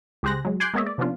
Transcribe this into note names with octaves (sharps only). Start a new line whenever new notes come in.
C#2 G4 G#4 C5 F#6 A#6
F#3 G#3
G#5 C6 D6 F#6 G6 C7
G#3 A#3 B3 C#5 D#5 E5
D5
C3 F3 B3 C#4 D4 F4